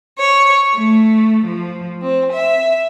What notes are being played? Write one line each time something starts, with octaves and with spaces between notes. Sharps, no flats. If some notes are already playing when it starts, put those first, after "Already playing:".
C#5
A3
F3
C4
E5